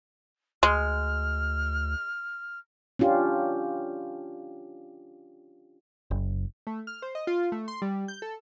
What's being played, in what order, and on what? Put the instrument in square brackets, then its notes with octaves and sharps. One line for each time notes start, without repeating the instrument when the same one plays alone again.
[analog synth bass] D2 [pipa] G#3 [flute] F6
[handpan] C#4 D4 F4 G4
[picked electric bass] F#1
[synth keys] A3
F6
C5
D#5
F4
A3
C6
G3
G6
A4